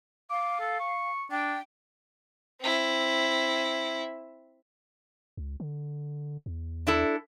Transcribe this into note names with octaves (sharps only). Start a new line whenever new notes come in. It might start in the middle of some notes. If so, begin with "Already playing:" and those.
F5 D6
A4
C#6
D4 G5
C4 E4
C#2
D3
E2
D4 E4 A4